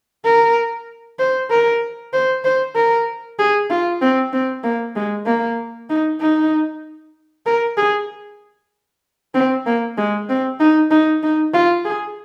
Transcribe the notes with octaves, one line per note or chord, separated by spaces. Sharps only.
A#4
C5
A#4
C5
C5
A#4
G#4
F4
C4
C4
A#3
G#3
A#3
D#4
D#4
A#4
G#4
C4
A#3
G#3
C4
D#4
D#4
D#4
F4
G#4